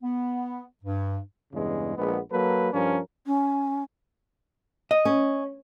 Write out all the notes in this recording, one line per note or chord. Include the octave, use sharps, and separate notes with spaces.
B3
G2
E2 G2 C#3 G#3
A#1 G#3 B3
F#3 A#3 A4 B4
G2 F3 C#4 A#4
C#4
D#5
C#4